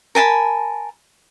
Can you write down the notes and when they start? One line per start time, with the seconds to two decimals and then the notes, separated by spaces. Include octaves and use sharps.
0.15 A#4 G#5 A5 B5